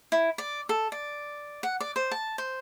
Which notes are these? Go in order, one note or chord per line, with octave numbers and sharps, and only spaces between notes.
E4
D5
A4
D5
F#5
D5
C5
A5
C5